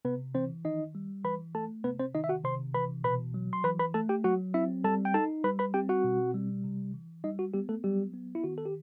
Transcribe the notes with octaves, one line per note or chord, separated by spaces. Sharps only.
C3 B3 B4
E3 C4 C5
D#3 D#4 D#5
G3
E3 B4 B5
A3 A4 A5
C3 B3 B4
C4 C5
D#3 D#4 D#5
E5
F#4 F#5
C3 C5 C6
E3 B4 B5
B2 B4 B5
F#3
C6
E3 B4 B5
B4 B5
A3 A4 A5
G4 G5
F#3 F#4 F#5
C4 E4 E5
G3 A4 A5
G5
D#4 A4 A5
G3 B4 B5
B4 B5
C4 G4 G5
F#4 F#5
B2
G3
C3
E3
G3 D#4 D#5
F#4
G3 B3 G4
A3 A4
F#3 G3 G4
B3
E4
D#3 F#4
A4
G4